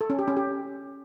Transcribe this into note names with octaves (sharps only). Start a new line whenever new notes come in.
A4
C#4
G4
C#4
G4